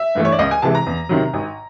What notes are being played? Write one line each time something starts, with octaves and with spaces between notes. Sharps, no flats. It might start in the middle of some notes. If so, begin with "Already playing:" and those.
Already playing: E5
G2 E3 A3
C#5
D5
C#2 D#5
G#5
C3 E3 G#3 A5
A#5
E2
C3 D#3 F#3
G#1